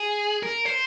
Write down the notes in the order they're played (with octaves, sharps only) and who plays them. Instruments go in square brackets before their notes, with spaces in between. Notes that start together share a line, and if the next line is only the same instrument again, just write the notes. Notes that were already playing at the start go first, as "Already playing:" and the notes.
Already playing: [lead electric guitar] G#4
A#4
C5